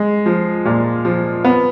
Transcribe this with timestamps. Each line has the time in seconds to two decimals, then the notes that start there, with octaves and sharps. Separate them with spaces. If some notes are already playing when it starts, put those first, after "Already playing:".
Already playing: G#3
0.26 F3
0.65 A#2
1.05 F3
1.45 B3